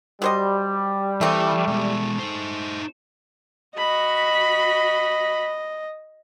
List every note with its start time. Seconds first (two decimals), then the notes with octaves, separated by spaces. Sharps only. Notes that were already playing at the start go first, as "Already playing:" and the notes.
0.22 F#3 G3 C5 D#5
1.21 E3 A3 C4 E4
1.68 B2 G#3
2.19 D#4 C5
3.77 F#4 D#5 B5